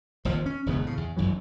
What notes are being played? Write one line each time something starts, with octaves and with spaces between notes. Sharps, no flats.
F1 D#2 F3
C#4
E1 E2 C#3 B3
A2 C#3
E2
G1 F#2 E3 F#3